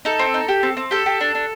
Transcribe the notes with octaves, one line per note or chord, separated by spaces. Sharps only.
D#4 A4
C4
D#4
G4
C4
C4
G4 A4
G4
D4
D4